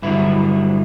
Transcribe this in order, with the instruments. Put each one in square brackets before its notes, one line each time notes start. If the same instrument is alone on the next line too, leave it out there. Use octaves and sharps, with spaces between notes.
[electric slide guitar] G2 D3 F#3 E4